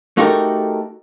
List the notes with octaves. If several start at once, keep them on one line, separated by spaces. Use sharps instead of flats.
A3 D#4 F#4 G4 A4 A#4